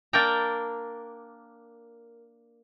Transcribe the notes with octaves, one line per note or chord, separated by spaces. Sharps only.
A#3 D4 A#4 D5 G5 A#5